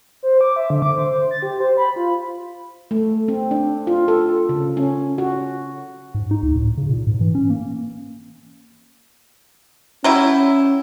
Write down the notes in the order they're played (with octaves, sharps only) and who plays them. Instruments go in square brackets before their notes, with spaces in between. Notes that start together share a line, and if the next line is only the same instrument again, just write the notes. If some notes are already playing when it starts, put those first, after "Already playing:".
[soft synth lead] C5
D6
E5
D3
D6
C5
C5
A6
G4
C5
B5
F4
[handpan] A3
C4
D4
F4
A4
C#3
C#4
F#4
[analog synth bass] G#2
D#4
D2
A2
C#3
A#2
G#2
E3
C#4
A#3
[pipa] F#3 G3 E4 [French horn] C#4